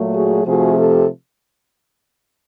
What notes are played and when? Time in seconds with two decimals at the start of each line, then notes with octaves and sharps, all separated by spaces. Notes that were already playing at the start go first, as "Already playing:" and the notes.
Already playing: A#2 F#3 A3
0.14 F#4 G#4
0.45 C3 F3 A3 F#4 G#4
0.76 G4 A4